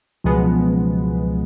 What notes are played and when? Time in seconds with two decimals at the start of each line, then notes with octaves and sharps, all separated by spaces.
0.24 C#2 B2 F3 G#3 B3
0.34 F#3
0.43 F3